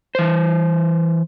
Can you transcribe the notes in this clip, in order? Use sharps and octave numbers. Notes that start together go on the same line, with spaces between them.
E3 C5